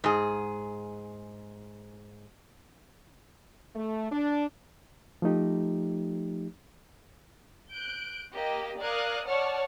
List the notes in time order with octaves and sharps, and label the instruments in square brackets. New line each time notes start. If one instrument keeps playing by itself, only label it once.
[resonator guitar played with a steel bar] G#2 G#4
[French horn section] A3
D4
[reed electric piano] F3 A3 D#4 G4
[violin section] F#6 G6 D7
A#3 G4 D#5
A#4 D5 F5 D#6 F#6 G#6
C#5 D5 F#5 A5 C#6 F6